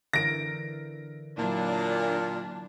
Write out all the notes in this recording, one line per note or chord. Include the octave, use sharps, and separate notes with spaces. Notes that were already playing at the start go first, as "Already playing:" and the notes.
D3 E3 A#4 A#6 D7
A#2 F#3 D4 E4